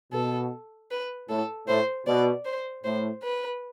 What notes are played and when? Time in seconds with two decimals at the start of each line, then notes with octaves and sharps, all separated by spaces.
0.13 B2 A4
0.90 B4
1.29 A2 A4
1.67 A2 C5
2.06 B2 D5
2.45 C5
2.84 A2 C5
3.23 B4